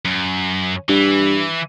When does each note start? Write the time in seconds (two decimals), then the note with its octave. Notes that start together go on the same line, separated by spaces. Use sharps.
0.05 F#2
0.89 G2 E3